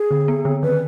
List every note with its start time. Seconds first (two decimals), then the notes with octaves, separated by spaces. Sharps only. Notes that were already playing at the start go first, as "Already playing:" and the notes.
Already playing: G#4
0.11 D3
0.28 B3
0.45 D3
0.63 D#3 B4